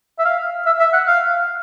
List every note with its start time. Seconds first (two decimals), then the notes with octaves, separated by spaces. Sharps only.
0.19 E5
0.25 F5
0.66 E5
0.80 E5
0.93 F#5
1.07 F5